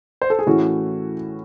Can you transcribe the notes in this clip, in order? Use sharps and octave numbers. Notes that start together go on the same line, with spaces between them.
C5
A4
G#4
A2 E3 A3 C#4 F#4